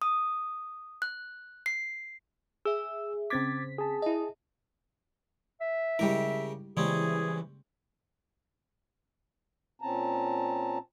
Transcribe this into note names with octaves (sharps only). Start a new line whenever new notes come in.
D#6
F#6
C7
G#4 E5 E6
C#3 C4 D6 G#6 A6 B6
G#4 A5
E4 D#5
E5
C#3 G3 G#3 E4 G4 A#4
C#3 E3 G3 G#3 A#3 C4 C#4 G#4
A#2 C4 C#4 A5 A#5